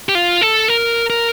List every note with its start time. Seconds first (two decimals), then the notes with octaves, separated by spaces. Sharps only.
0.09 G4
0.15 F4
0.41 A4
0.68 A#4
1.10 A#4